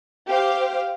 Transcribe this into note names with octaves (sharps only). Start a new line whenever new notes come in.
G4 C5 F5